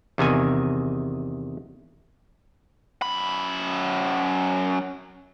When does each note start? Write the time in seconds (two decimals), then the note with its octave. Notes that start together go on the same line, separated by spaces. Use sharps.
0.18 E2 C3 D#3 G#5
3.02 F#2 B5